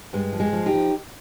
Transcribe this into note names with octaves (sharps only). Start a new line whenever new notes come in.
G2 G#3
F3
G#3
F3
D#4 G4
F3